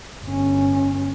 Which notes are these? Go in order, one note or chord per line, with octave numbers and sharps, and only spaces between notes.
G1 C#4